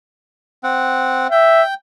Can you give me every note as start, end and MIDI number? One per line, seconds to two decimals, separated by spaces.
0.64 1.27 60
0.64 1.27 78
1.31 1.62 76
1.31 1.74 79